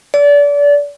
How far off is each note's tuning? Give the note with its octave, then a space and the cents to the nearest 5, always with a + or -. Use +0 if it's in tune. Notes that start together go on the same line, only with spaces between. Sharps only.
D5 -30